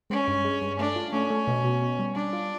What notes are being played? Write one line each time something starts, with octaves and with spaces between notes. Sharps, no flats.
G#3 C#4
G2
G#3
G2
A3 D4
F4
A3 C#4
A3
B2
B2
B2
G3
G3 D4
F4